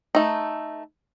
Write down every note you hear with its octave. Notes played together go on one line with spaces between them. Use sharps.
A3 D#4